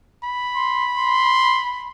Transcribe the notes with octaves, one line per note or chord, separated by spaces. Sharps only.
B5
C6
C6